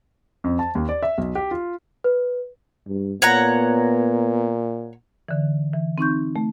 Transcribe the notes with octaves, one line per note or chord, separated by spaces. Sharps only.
F2
A5
D#2
D5
E5
B1
G4
F4
B4
G2
A#2 B3 C#5 F#5 A#5
D3 E3
E3
C4 D#4 C#6 G6
A3